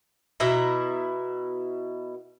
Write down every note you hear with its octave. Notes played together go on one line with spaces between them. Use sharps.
B2 E4 E5 A#5